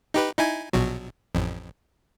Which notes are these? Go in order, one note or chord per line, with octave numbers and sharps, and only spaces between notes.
D#4 G4 B4
D#4 E4 G#5
A#1 B2 F#3
A1 F2